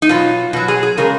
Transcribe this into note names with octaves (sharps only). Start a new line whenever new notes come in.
D#4
B2 F#3 F4
B2 F#3 F#4
G#4
G#4
C#3 G#3 A#4